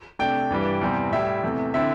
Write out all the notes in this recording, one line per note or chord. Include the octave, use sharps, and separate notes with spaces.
C3 A3 D4 G5
G2 E3 G3
E2 C3 G3 C4
A2 G3 E4 E5
E2 C3 A3
D3 C4 E4 E5